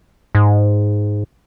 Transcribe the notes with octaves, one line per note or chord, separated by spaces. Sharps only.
G#2